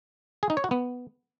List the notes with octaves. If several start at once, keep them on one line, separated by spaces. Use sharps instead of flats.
G#4
D#4
C#5
F#4
B3